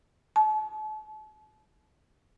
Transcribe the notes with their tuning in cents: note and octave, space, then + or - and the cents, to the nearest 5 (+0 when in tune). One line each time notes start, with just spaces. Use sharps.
A5 -40